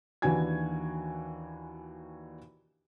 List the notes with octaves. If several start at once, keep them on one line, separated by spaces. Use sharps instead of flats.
D#2 E3 D4 F#4 G#5 G#6